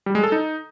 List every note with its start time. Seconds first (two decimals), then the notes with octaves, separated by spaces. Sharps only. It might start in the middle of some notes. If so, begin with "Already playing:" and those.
0.06 G3
0.15 G#3
0.23 A4
0.32 D#4